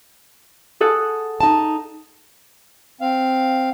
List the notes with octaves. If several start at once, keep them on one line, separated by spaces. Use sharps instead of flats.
G#4 A4 F#5
D#4 A5
C4 F5